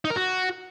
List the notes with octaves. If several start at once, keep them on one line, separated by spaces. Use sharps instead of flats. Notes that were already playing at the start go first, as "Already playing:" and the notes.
D#4
A#4
F#4